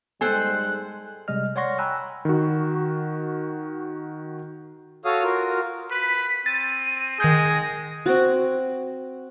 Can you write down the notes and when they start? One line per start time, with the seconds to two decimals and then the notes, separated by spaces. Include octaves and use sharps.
0.21 G#2 G3 G#3 A4 C5 G5 G#5 F#6
1.28 C3 G3 G#3 D#5 F6
1.56 C#5 D5 F#5 C6 C#6 A#6
1.79 G5 G#5 A#5 B5 E6 F#6
2.25 D#3 F#4
5.05 F#4 A4 C#5 F5 D#6
5.23 F4 F#4 A#4
5.91 B4 B6
6.46 C4 A6 D#7
7.20 D#3 G#3 G#4 G6 A#6
8.06 C4 F#4